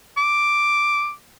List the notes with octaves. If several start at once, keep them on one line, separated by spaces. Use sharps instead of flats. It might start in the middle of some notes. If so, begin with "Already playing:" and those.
D6